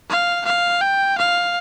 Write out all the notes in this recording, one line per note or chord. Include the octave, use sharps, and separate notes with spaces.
F5
F5
G5
F5